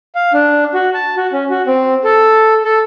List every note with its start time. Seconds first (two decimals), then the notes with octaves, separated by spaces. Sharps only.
0.15 F5
0.33 D4
0.74 F#4
0.94 A5
1.17 F#4
1.33 C#4
1.50 F#4
1.67 C4
2.04 A4
2.64 A4